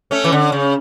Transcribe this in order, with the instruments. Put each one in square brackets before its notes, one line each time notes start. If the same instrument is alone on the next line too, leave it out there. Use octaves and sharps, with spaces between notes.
[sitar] A3 C#4
E3
D3
C#3